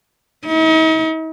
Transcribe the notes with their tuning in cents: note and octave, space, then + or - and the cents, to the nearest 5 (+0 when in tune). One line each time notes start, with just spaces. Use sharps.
D#4 +45